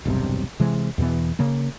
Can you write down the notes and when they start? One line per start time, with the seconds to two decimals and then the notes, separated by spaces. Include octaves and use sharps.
0.05 E1 B1 G2 C3
0.60 C3 E3 G#3
0.98 E2 B2 E3 B3
1.39 C#3 A#3